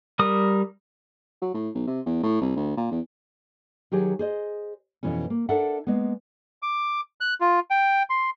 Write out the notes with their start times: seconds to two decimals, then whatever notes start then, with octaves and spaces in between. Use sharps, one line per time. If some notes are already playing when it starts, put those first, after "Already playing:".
0.19 G3 A#4 D#6
1.42 F#3
1.54 A2
1.75 B1
1.87 C3
2.06 E2
2.23 A2
2.41 C2
2.56 D2
2.77 A#2
2.91 E2
3.92 D#3 F#3 G4 G#4
4.19 G#4 C5 D#5
5.03 F2 B2 E3 B3 C#4
5.30 A#3
5.49 D4 A4 A#4 E5 F#5
5.87 G#3 A#3 B3
6.62 D6
7.21 F#6
7.41 F4
7.70 G5
8.10 C6